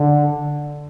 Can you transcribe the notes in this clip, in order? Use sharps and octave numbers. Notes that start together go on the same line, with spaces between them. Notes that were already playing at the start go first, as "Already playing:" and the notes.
Already playing: D3